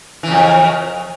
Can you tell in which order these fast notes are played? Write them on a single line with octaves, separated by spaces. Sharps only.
E3 C#3 F2